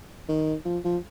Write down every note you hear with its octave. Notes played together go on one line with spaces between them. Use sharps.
D#3
F3
F3